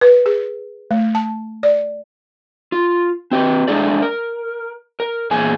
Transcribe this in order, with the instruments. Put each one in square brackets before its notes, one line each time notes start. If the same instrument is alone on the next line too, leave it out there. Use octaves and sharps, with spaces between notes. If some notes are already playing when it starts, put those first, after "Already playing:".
[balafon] B4
G#4
A3
A5
D5
[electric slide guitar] F4
C4 G4 B4
G#3 A3 D4 G#4 D5
A#4
A#4
E2 A#2 G#4 G#5